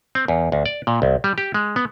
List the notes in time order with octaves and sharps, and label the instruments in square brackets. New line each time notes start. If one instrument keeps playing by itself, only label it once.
[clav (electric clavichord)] C4
E2
D2
D5
A#2
C2
G3
G4
G#3
B3